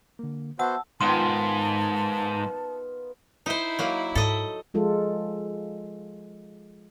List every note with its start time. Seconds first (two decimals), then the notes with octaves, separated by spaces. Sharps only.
0.19 D3 A#3
0.59 B3 F#4 C5 E5 F#5 A5 E6
1.01 G#2 D#3 B3 F4 A5 C6
3.46 D#4 E4 C5
3.79 F#3 A#3
4.15 G#2 A4 D#5
4.74 F3 G#3 F4 A4